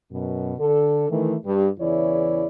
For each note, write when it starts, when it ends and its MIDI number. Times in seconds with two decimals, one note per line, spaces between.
0.12 0.55 42
0.12 0.55 47
0.58 1.07 50
0.58 1.07 69
1.10 1.35 51
1.10 1.35 52
1.10 1.35 57
1.45 1.68 43
1.45 1.68 67
1.79 2.48 40
1.79 2.48 49
1.79 2.48 52
1.79 2.48 64
1.79 2.48 73
1.79 2.48 74